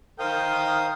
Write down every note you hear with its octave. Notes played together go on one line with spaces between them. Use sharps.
D#3 A#4 C5 F5 G5 D#6